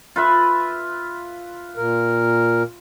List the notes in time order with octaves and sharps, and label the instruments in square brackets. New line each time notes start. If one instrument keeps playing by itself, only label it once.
[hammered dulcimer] F4 B4 E5
[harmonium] A#2 A#4